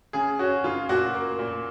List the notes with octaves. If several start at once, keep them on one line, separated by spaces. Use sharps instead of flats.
C#3 G#4
C#4 F#4
C#3 F4
A#2 F#4
A#3
A#2